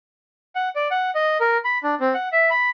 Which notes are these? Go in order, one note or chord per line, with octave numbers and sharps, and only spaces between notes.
F#5
D5
F#5
D#5
A#4
B5
D4
C4
F#5
E5
B5